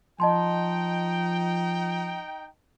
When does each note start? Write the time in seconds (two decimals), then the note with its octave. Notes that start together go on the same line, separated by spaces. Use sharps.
0.20 F3 D#4 D#5 G5 A5 C6